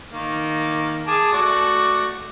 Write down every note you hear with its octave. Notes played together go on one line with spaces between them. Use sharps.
D#3 A#3
G#4 A5 D6
A3 F#4 D5